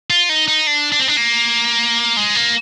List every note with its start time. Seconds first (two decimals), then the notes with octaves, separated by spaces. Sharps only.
0.10 F4
0.29 D#4
0.48 D#4
0.67 D4
0.92 D4
1.00 C4
1.08 D4
1.17 A#3
2.17 G#3
2.35 A#3